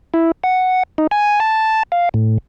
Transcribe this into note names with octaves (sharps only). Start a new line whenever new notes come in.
E4
F#5
D#4
G#5
A5
F5
A2